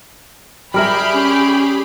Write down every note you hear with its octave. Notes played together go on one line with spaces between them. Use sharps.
G3 G4 G#4 A#4 E5 B5
C#4